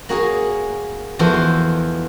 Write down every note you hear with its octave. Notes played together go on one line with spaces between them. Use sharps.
A#3 F#4 G#4 C#5
E2 E3 F3 F#4 A4 C5